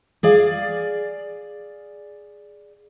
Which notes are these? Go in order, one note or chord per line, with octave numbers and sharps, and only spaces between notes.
G#4 D5 F5